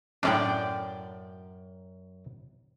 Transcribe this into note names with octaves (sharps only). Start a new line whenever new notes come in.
F#2 A2 C#4 D4 D5 G5